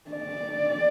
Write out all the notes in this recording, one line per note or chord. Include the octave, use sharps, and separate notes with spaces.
D5